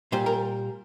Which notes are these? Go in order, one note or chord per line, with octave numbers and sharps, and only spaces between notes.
A#2 G3 C5
A#4